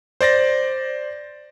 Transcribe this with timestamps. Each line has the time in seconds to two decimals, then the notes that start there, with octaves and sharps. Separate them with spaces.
0.21 C5 D5 A6 A#6